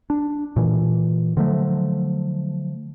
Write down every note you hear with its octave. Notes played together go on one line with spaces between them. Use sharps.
D4
A#2 E3
D3 F3 F#3 A3